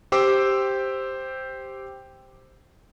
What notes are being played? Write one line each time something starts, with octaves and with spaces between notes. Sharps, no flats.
G4 C5 G5 D6 E6